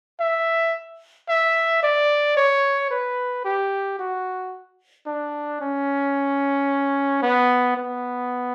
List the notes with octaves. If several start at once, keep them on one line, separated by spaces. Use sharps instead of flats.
E5
E5
D5
C#5
B4
G4
F#4
D4
C#4
B3
B3